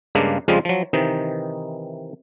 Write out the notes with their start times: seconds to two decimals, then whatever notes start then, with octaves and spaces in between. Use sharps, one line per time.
0.15 G2 C#3 G#3 A#3 D4
0.48 F2 C#3 F3 G3 G#3 F4
0.65 F3 F#3
0.93 C3 D#3 E3 D#4